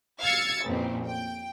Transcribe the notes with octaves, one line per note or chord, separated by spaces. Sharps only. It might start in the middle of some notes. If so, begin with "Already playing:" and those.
F5 E6 G#6 A6 C#7
A1 F2 A#2 C4
G5